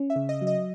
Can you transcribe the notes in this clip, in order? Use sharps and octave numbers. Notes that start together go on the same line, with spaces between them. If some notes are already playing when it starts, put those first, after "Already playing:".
Already playing: C#4
E5
C#3
D#5
F#3
D#5